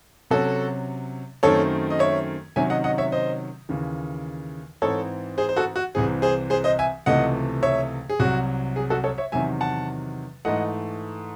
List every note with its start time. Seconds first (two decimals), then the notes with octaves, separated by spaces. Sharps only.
0.31 C3 F#3 C#4 F#4 A4
1.43 F#2 D#3 A3 C4 A4 C#5
1.90 D#5
1.99 C#5 E5
2.56 C3 D#3 F#3 C#4 E5 G#5
2.70 D#5 F#5
2.84 D#5 F#5
2.98 C#5 E5
3.12 C5 D#5
3.69 D#2 C#3 E3
4.82 G#2 E3 C4 A4 C#5
5.38 G#4 C5
5.49 C5
5.57 F#4 A4
5.76 F#4
5.95 C2 C3 E3 C4 G#4
6.22 G#4 C5
6.50 G#4 C5
6.64 C5 D#5
6.79 E5 G#5
7.06 C#2 C3 E3 A3 D#5 F#5
7.63 C#5 E5
8.10 G#4
8.20 C2 C3 F#3 F#4
8.76 G#4
8.90 F#4 A4
9.04 A4 C#5
9.18 C#5 E5
9.32 E2 C3 D#3 F#3 E5 G#5
9.61 F#5 A5
10.45 G#2 E3 A3 D#5 F#5